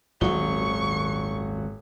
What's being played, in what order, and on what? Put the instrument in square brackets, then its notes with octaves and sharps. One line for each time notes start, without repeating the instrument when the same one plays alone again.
[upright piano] D#1 F#4 G7 [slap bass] G#1 F#3 [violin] C#6